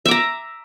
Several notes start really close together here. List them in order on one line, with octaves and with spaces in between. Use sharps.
E5 D6 A#5